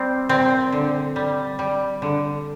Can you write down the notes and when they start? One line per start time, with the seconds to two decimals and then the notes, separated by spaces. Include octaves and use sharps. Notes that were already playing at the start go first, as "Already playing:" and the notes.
Already playing: G3 C4
0.29 A#2 C4
0.72 D3
1.16 G3
1.59 G3
2.02 D3